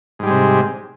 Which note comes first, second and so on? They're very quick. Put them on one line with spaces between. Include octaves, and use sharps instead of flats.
G#2 G3 G#3 C3